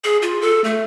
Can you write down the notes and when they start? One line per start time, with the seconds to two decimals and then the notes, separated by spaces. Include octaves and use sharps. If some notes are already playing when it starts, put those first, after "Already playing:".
0.04 G#4
0.22 F4
0.41 A4
0.64 A3